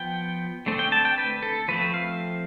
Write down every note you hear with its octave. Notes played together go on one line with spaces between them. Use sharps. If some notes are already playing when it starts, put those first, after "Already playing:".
Already playing: F3 B3 G5
D3 A3 C4
G5
A5
G5
B4
A4
F3 A3 C4 B4
F5